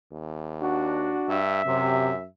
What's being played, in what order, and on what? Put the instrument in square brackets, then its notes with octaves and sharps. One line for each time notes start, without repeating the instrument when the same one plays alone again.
[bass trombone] D#2
[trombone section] D4 F#4
[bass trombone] G2 [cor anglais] E5
[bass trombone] F#2 [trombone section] C3